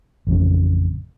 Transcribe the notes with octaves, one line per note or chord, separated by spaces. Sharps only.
A1 F2 C#3